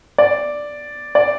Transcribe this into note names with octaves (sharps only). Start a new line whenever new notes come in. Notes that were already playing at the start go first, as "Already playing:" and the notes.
D5
D5